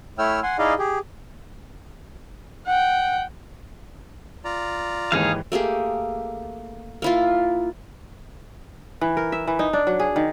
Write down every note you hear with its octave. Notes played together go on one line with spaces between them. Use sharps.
A3 E4 C#5 G5 E6 F6
F#5 G#5 C6
D#4 E4 G#4 D5 D#5 F5
G4 G#4
F#5 G5
F4 D5 A#5
D#2 G#2 E3 D#4 G#4 F5
A3 A#3 G4 G#4
A#3 E4 F4
E3
A#4
E5
E3
D#4
D4
F#3
G#4
D#3